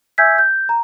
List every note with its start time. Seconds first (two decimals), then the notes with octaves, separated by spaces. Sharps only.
0.18 E5 G#5 E6 G6 G#6 B6
0.38 G6
0.69 A#5